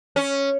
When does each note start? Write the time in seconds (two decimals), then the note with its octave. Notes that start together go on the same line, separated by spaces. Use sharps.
0.16 C#4